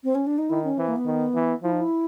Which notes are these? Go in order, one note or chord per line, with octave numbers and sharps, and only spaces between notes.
C4
C#4
D4
D#4
D#3 E4
C#4
E3 C4
A#3
B3
D#3
E3
F3 E4
D#4
E4